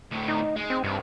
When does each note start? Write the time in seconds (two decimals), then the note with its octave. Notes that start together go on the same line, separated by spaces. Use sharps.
0.11 D2 A2
0.28 D#4
0.56 G#3
0.70 C4
0.84 C2 G2